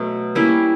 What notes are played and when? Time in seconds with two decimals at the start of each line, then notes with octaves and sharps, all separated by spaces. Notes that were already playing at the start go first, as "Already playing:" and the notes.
Already playing: B2 F#3 A3
0.35 G3 A#3 C#4 E4